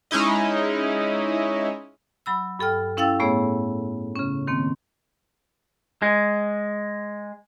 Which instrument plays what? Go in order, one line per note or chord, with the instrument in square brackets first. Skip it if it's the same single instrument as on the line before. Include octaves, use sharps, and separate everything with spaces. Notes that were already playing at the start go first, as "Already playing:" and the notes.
[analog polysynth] G#3 C#4 D#4 E4 D#5
[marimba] F#3 B5 E6
G2 A4 G5 F6
C#4 E4 F5 G5 E6 A6
A2 A3 B3 G#4 C#5
C#3 C#4
D#3 A#3 C4
[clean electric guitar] G#3